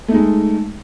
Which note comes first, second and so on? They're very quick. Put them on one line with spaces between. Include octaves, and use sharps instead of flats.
A3 D#4 G#3